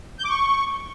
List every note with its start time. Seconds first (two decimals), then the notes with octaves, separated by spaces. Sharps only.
0.19 G6
0.24 D6
0.30 C#6